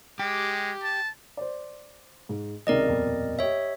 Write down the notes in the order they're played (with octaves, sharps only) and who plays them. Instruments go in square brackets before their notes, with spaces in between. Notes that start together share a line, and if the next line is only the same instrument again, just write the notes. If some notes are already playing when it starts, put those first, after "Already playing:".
[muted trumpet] G#3 [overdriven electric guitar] G4
[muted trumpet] A5
[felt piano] C5 D5
G#2
[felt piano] C#2 C3 D#3 [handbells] A#4 D5 D#5
[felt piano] D#1 F2 B2
[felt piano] G4 D#5 [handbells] C#5 E5